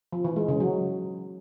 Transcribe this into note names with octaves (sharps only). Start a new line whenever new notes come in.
F3
E3
G#3
C#3
F#3